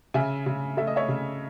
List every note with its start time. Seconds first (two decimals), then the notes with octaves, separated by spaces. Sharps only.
0.14 C#3 E5 G#5
0.46 C#3
0.77 A3 E5
0.87 D#5
0.96 C#5 E5
1.08 C#3